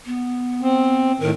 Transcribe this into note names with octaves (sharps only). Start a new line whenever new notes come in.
B3
C4
A2 D#3 A#4